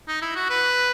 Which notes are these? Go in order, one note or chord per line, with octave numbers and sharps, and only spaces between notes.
D#4
E4
F#4
B4